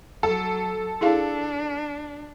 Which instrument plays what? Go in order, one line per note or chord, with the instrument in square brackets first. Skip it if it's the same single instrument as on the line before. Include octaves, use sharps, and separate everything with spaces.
[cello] F#3 [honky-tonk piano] A4
[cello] D4 [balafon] E4 G#4 F5